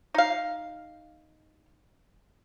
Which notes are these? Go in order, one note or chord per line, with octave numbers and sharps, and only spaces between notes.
D#4 F5